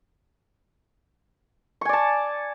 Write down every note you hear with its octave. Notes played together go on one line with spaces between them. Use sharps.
D5 G#5 A5 C#6